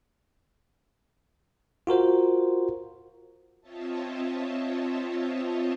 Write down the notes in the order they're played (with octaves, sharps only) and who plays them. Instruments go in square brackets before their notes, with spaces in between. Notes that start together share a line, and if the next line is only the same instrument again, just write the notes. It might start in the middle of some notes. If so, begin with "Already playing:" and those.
[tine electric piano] F4 F#4 A#4 C5
[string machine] C4 F4 C#5 D#5 E5 A5